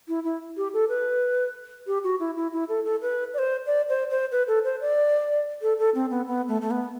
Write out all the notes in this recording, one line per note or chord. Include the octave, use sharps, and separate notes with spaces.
E4
E4
G4
A4
B4
G4
F#4
E4
E4
E4
A4
A4
B4
D5
C5
D5
C5
C5
B4
A4
C5
D5
A4
A4
C4
B3
B3
A3
A3
B3